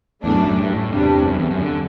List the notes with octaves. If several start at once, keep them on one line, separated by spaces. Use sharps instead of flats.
E2 A2 F#3 A3 D4
F#2
F#2
G2
A2
E2 G2 C3 G3 D4
F#2
E2
F#2
D3